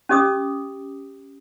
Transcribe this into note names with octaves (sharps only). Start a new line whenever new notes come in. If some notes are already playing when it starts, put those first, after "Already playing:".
C#4 G4 D#5 D6 D#6